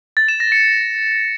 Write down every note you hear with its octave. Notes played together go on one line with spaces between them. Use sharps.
A6
E7
A#6
C#7